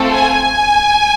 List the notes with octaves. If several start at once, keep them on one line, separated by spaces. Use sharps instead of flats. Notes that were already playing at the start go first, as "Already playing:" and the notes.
Already playing: A3 C4 F4 A4
G#5